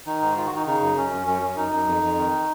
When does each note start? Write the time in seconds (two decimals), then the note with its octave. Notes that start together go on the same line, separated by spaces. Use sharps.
0.06 D#3 D#4
0.21 G#2
0.36 D#3 F4
0.46 F#4
0.51 D#3 D#4
0.67 C#3 D#4
0.82 F#2
0.97 F#2 C#4
1.11 F#2
1.27 F#2 C#4
1.42 F#2 C#4
1.57 F#2 D#4
1.72 F#2
1.88 F2
2.03 F2
2.18 D#3